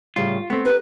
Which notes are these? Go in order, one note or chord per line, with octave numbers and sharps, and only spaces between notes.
A2 C#3 G3 F4
A3 B3 C4
C#4 G4 A#4 B4